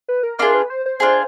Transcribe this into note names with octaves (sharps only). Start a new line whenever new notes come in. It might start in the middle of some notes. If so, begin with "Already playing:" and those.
B4
A#4
D4 F4 G#4 A#4
B4
C5
C5
D4 F4 G#4